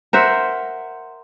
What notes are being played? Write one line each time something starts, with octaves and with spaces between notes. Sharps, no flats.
A#4 C5 E5 F#5